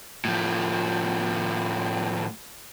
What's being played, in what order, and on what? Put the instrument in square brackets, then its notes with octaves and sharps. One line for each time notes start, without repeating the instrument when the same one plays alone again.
[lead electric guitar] A2 F3